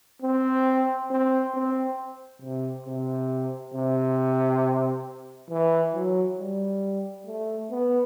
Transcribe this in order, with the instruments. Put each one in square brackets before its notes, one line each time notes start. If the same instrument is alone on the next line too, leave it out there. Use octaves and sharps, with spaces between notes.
[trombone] C4
C4
C4
C3
C3
C3
E3
F#3
G3
A3
B3